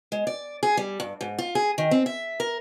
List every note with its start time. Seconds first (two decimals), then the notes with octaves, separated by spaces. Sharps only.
0.12 G#3
0.27 D5
0.63 G#4
0.77 G3
1.00 G2
1.21 G#2
1.38 F4
1.55 G#4
1.78 D#3
1.91 C4
2.06 E5
2.40 A#4